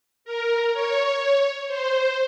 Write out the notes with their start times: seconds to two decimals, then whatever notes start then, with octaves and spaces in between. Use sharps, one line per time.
0.25 A#4
0.73 C#5
1.68 C5